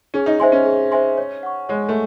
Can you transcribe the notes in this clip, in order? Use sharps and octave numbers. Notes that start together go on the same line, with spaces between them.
C#4 G#4
D#4
D#4 C5 E5 G#5 C6
C#4
G#4
C5 E5 G#5 C6
C#5
F#5 C#6
G#3 C#5
A3